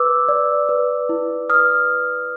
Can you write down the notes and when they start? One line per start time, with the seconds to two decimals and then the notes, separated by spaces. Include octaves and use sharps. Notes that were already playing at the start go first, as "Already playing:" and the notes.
Already playing: B4 D6 E6
0.28 D5
0.69 B4
1.09 E4
1.49 B4 D#6 F6